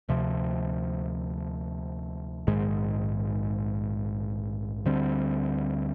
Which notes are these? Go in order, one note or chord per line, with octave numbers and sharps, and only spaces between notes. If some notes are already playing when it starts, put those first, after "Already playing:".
D2 C3 F3
A#1 G#2 D#3 G#3
D2 D3 G3 C4